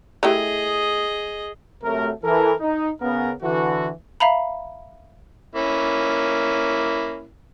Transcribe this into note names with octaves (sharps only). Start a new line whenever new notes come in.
A3 E4 G4 G#4 D#5
C3 F#3 A3 A#4
E3 A4 A#4
D#4
C#3 B3 A#4
D3 E3 F#4
E5 F5 A#5 B5
A#3 C#4 E4